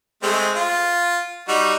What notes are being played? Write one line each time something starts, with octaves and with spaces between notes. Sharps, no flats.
G#3 A3 C4
F4
G3 D#4 F#4